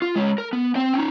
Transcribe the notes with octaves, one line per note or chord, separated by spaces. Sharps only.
F4
G#3 C#5
A#4
B3
C4 G5
C#4 D#4